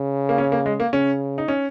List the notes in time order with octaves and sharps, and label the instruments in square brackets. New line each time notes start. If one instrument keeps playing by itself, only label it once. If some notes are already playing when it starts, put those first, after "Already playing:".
Already playing: [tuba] C#3
[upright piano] A#3
C#4
A#3
G#3
A#3
[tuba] C#3 [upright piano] C#4
[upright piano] D#4
C#4